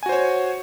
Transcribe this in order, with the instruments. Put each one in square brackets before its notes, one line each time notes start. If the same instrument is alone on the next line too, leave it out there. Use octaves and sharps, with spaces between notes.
[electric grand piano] G#5
F#4
C5
C#5